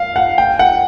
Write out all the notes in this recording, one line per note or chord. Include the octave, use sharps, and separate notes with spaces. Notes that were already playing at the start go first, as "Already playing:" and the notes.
Already playing: F5
F#5
G5
F#5